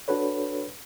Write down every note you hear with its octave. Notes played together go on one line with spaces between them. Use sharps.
D4 F#4 A4 B4 C#5